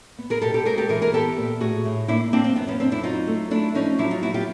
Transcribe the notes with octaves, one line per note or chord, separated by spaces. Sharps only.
B3
G#4 A#4
B2 G4 A4
G4 A4
G#2 G#4 A#4
G4 A4
E3 G#4 A#4
G#4 A#4
B3 G4 A4
A#2
A2 F#4 G#4
A2
A#3 D4 E4
A#3 C4 D4
C4
F#2 B3
B3 C#4
F#2 C4 D4
D4 E4
F#3 D#4 F4
A3
A3 D4 E4
F3 C#4 D#4
F#3 D4 E4
D#4 F4
B3 E4 F#4
F4 G4